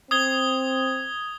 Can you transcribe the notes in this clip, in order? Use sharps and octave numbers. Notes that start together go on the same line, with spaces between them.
C4 D#6 G#6 G7